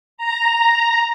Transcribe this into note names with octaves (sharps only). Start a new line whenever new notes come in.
A#5